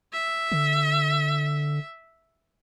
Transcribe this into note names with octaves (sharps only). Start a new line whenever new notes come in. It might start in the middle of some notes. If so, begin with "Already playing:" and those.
E5
D3